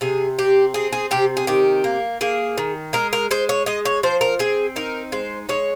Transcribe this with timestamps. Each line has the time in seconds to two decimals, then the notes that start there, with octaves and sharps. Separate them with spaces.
0.01 C3 G#4
0.39 C4 G4
0.74 C4 G#4
0.93 G#4
1.11 C3 G4
1.37 G#4
1.47 D#3 G4
1.84 A#3
2.21 A#3 G#4
2.58 D#3
2.93 G#3 A#4
3.13 A#4
3.31 G#3 C5
3.49 C#5
3.66 G#3 D#5
3.85 C#5
4.03 F3 C5
4.21 A#4
4.39 C4 G#4
4.76 D#4 A#4
5.12 G#3 C5
5.49 G#3 C#5